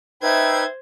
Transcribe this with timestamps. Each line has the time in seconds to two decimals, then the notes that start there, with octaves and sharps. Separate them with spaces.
0.23 D#4 B4 C5 E5 G5 G#6